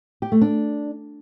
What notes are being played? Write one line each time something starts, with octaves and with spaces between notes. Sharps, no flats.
G4
A3
D4